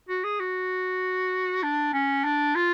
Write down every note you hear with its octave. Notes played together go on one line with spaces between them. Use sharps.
F#4
G#4
F#4
D4
C#4
D4
F4